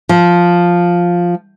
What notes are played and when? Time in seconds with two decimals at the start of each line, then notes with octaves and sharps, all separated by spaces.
0.09 F3